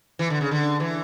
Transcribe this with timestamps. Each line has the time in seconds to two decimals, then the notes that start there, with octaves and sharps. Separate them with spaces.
0.19 E3
0.30 D3
0.41 C#3
0.51 D3
0.80 E3